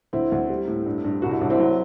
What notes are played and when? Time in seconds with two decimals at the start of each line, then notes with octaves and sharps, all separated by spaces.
0.13 D2 C4 E4
0.32 D2
0.49 G3
0.67 A2
0.86 G2
1.05 G2
1.22 C2 F#4
1.32 E4
1.41 C2 D4
1.50 C4 E4
1.60 F#3